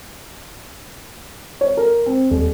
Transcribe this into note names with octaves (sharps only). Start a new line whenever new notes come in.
C#5
A#4
C4
D#1